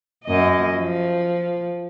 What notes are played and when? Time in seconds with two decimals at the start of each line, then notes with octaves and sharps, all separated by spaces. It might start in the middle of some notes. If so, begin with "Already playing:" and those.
0.25 F#2 D#5
0.76 F3